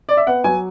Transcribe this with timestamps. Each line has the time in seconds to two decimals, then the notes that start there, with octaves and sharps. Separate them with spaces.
0.09 D5
0.17 E5
0.27 B3 F#5
0.44 F#3 G#5